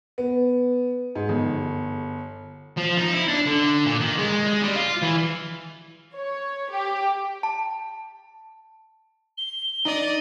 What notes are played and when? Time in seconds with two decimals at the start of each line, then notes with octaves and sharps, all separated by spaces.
0.18 B3
1.15 G#2
1.29 G1
2.77 F3
2.98 D#4
3.13 E4
3.28 D4
3.47 D3
3.86 A#2
4.00 D#3
4.19 G#3
4.47 G#3
4.63 G3
4.76 F4
5.02 E3
6.15 C#5
6.70 G4
7.43 A5
9.38 G7
9.85 D#4 D5 D#5